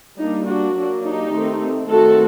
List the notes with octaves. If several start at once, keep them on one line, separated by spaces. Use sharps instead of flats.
G3 A#3 D4 D#4
D4 F#4
F#3 A#3 D4
D#4 G4
D#3 A3 C4
D#3 A3 C4 F#4 A4